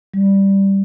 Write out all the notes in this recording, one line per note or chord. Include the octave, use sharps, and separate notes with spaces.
G3